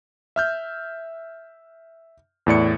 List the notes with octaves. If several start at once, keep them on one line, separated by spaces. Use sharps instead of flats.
E5 F6 G6
E2 A2 D5 C#7